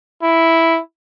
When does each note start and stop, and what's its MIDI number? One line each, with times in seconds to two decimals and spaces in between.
0.23 0.80 64